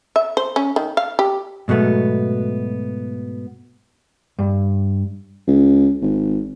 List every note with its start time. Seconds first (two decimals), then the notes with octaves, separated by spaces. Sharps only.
0.16 E5
0.37 C5
0.56 C#4
0.76 D#3
0.97 F5
1.19 G4
1.68 G#2 B2 F#3 A3 B3
4.39 G2
5.47 C#2
6.02 G#1